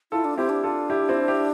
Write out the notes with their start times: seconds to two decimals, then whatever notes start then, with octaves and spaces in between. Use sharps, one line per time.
0.12 E4 F4 A4
0.25 D4
0.37 C4 E4 G4
0.49 D4
0.64 F4 A4
0.90 E4 G4
1.09 C4 E4
1.28 E4 G4